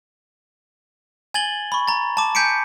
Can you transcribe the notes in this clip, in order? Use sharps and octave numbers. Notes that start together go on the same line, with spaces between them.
G#5 G#6 A6 F#7 G7
B5 C#6
A#5 A6
A5 D6
G#5 G6 B6 C#7 D7